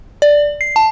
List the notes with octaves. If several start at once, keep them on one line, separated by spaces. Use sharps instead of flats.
D5
C7
A5